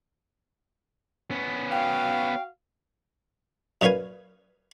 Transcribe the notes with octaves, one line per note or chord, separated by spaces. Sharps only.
B3 C#4
F#4 F5 G5
F#2 A#2 C#4 B4 F5 G#5